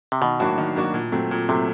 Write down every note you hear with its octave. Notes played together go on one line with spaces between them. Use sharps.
C3
B2 D#3
A2 F#3 A#3 D4 F#4
D#3
F#3 A#3 D4 F#4
A#2
F#3 A3 C4
A#2
C3 F#3 A3 C4